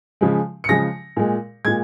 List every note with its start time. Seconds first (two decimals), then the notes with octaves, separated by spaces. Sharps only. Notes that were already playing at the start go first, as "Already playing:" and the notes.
0.21 C#3 F3 G#3
0.64 C#7
0.69 C#3 F3 G#3 A#6
1.16 A#2 G#3
1.65 A#2 G#3 G#6